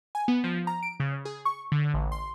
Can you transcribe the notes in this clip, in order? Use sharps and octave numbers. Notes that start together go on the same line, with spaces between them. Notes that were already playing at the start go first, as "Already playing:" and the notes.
G#5
B3
F3
A#5
D7
C#3
G#4
C#6
D3
A1
C6